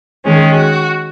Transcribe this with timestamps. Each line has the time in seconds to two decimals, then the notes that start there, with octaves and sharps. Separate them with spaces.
0.24 D#3 G#3 C#4 G#4
0.54 F#4